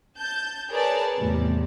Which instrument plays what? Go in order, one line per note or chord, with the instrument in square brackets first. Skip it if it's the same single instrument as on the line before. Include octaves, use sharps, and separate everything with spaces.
[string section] A5 G6
G#4 A#4 B4 C#5 D5 A5
E2 A2 C3 G3